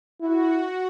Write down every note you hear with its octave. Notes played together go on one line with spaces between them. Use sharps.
E4 F#4